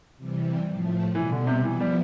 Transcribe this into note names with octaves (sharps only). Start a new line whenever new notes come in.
C3 E3 G3
A2 F3 A3
B2 E3 G3 B3
D3
C3
E3 F3 B3 E4
G3